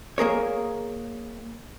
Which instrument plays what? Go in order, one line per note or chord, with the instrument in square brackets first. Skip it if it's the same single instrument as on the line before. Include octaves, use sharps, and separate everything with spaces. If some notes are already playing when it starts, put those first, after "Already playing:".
[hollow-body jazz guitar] A#3 G#4 A#4 C#5